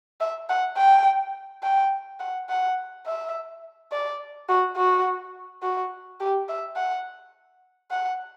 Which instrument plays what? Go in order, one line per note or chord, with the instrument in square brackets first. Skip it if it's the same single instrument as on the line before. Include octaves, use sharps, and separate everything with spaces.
[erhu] E5
F#5
G5
G5
F#5
F#5
E5
D5
F#4
F#4
F#4
G4
E5
F#5
F#5